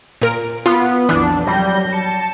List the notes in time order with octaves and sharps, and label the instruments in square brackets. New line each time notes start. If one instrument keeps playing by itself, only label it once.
[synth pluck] A#2 A#4 D7
[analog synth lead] B3 [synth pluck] F4
[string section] B1 F2 [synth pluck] E3 [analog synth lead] D4
[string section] F#3 G6 A#6 [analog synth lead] G3
[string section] A5 [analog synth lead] C#7